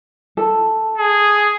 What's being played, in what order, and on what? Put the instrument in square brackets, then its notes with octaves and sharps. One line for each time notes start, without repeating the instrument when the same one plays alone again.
[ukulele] A4
[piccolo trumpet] G#4